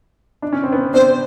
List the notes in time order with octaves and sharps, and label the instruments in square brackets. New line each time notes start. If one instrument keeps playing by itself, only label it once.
[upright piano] D4
C#4
C4
B3 C#4
[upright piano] C4 D4 [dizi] C5